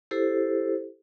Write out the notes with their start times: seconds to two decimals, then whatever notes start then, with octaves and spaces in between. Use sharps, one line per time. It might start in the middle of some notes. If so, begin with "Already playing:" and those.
0.11 E4 G4 A4 C5